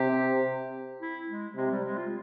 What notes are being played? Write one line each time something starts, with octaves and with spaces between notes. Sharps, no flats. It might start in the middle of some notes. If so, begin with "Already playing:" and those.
Already playing: C3 G4
E4
G#3
C3 G#3
G3
G#3
F4